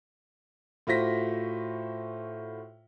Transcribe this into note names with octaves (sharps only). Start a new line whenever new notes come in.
A2 F4 F#4 C5 A#6 B6